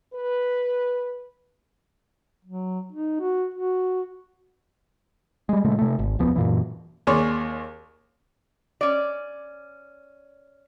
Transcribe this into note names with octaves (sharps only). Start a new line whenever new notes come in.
B4
F#3
D#4
F#4
F#4
G3 G#3
A#2 C#3 G#3 A3
C3 A3
G#1
E1 C#2 F3 B3
F#2 A#2 E3
D#2 G#4 C#5 D5 C6 C#6
C#4 D5